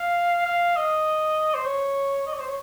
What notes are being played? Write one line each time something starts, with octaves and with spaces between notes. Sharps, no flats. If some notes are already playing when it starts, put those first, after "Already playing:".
Already playing: F5
F5
D#5
C5
C#5
D#5
C#5
C5
C#5